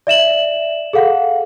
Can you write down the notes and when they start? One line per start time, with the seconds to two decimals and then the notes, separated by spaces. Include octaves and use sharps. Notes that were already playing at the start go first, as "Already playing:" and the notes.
0.07 D5 E5 E7 F#7
0.93 G#4 A4 F5 F#5